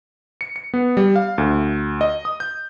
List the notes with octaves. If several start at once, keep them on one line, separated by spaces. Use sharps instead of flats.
C#7
C#7
B3
G3
F5
D2
D#5
D#6
G6